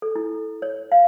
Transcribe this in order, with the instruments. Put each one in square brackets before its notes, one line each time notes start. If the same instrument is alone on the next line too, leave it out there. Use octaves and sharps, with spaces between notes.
[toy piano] A4
E4
C#5
F5